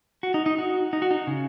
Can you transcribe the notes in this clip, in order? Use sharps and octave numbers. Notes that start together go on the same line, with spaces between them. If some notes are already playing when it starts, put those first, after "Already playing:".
F#4
D#4
D#4
F#4
D#4
F#4
D#4
C#3